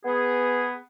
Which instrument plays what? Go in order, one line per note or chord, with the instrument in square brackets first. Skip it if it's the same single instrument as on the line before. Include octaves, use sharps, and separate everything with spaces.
[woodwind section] B3 G#4